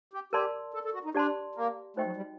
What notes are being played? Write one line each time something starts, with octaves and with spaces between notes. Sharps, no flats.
G4
G4 A#4 D5 A5 C6
A4
A4
F#4
D#4
D4 G4 D5 A5 C6
A#3
A3 D#4 F#4 C5 D#5 G5
F#3
G3